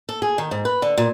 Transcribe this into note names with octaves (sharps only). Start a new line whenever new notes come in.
A4
G#4
D#3
G#2
B4
D3
A#2